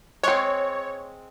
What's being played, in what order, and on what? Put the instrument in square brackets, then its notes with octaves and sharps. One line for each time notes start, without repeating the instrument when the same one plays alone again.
[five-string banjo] G#3 C4 [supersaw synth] C#5